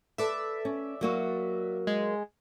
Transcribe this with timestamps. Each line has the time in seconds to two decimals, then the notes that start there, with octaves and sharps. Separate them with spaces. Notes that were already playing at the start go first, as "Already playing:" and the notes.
0.18 A4 B4 D5 E5
0.65 C#4
1.01 F#3 A#3 F#4
1.87 G#3